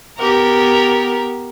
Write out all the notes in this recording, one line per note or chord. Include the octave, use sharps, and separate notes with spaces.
B3 G4 A#4